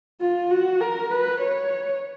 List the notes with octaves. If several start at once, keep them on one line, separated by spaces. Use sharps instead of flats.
F4
F#4
A#4
B4
C#5